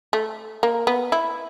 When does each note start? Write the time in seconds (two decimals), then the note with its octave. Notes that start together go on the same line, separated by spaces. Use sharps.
0.13 A3
0.63 A#3
0.87 B3
1.12 E4